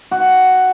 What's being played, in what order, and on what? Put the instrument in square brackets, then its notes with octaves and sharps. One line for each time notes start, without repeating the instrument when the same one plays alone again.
[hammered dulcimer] F#4